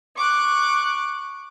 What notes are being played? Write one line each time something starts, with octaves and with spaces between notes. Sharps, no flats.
C#6 D6 F#6